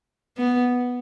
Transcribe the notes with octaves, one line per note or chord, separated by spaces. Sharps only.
B3